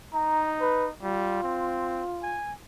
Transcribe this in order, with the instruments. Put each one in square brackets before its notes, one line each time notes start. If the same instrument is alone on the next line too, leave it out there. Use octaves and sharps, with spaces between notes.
[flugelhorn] D#4 [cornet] A#5
[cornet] B4
[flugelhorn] G3 [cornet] F4
[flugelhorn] C4
G#5